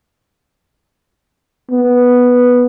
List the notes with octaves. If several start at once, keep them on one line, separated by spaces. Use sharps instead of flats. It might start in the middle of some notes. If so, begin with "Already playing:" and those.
B3